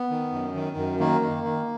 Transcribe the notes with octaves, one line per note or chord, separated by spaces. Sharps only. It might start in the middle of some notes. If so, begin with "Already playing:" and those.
Already playing: B3
D#3
F#2
D#3
F#2
D#3 A#3
D#3
D#3